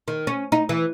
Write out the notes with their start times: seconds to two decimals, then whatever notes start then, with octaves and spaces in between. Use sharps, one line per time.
0.08 D#3
0.27 C#4
0.52 D#4
0.69 E3